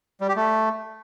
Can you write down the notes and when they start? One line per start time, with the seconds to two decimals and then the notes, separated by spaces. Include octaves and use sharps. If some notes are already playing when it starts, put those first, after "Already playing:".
0.21 G3
0.28 G4
0.36 A3